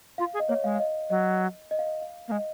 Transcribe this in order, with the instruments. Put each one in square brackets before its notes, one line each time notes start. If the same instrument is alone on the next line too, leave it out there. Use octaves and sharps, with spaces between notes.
[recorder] F4 [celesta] F5
[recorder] G#4
[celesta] D#5
[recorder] A#3 [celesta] C#5
[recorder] G#3 [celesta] F5
[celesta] F5
D#5
[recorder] F#3 [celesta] D#5
[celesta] D#5
F5
D#5
F5
[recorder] A#3
[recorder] G#3 [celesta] D#5